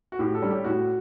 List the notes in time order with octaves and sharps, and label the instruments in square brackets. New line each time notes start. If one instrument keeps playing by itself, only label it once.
[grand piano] F#4
[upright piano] A2 [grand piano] G4
[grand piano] A4
[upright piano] G3 C#4
[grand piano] G4
[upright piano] A2 [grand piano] F#4